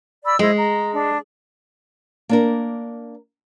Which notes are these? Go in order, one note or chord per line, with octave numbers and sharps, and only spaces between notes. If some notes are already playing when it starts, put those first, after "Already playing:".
D5 B5 E6
G#3 E4 C5 D#5
A#5
D4
A#3 D4 A#4